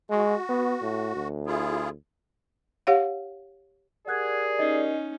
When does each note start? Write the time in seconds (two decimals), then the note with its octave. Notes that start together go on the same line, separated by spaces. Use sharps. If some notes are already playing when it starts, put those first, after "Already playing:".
0.10 G#3 F#4
0.49 B3
0.82 A2
1.16 D2
1.46 E4 F4 G#4
2.87 G4 C#5 F5 F#5
4.08 G4 G#4 A#4 D5 F#5 F#6 G#6
4.59 C#4 D#4 D#5 C7